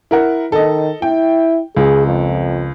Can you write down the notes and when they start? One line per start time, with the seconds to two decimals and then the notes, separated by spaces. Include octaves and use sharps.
0.11 E4 A#4 F#5
0.52 D#3 A4 D#5
1.02 E4 G5
1.77 C#2 G#4
2.07 F2